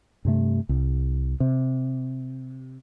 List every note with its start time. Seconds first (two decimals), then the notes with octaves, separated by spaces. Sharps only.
0.25 G2 C3 A3
0.69 C2
1.40 C3